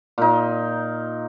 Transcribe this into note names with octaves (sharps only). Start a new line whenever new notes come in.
A#2 D#4